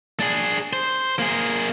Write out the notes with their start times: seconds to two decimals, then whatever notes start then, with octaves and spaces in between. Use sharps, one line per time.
0.20 D4 G#4
0.73 C5
1.19 A#3 G#4